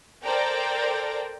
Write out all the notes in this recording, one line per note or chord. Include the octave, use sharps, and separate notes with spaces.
A4 A#4 C5 D5 G5 A#5